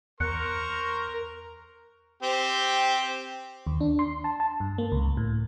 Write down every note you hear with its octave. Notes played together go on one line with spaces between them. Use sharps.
E2 A#4 C5 A#5 C#6 F#6 C#7
C4 G4
D#2
D4
C6
A5
A5
G2
A#3
C#2
A2